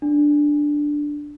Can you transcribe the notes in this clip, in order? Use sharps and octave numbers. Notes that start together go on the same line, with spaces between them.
D4